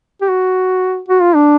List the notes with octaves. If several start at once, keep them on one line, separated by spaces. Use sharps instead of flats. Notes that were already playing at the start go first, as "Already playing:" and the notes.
G4
F#4
F#4
F4
D4